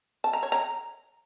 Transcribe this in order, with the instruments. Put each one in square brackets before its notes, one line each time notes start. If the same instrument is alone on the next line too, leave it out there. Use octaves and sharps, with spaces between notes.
[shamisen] A5
A#5
C#5
A#5